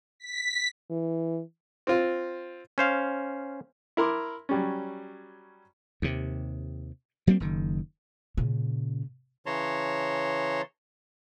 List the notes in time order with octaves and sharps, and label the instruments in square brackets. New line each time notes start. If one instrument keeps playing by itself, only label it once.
[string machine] B6
[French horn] E3
[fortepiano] C4 F4
[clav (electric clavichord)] C#4 C5 F5
[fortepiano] E4 A#4 C6 D6
F#3 G3 C#4
[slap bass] D#2 C3
F#3 G3 A#3 C4
F#1 D#3
[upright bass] A#2 C#3
[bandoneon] C#3 E3 C#5 A5 A#5 C6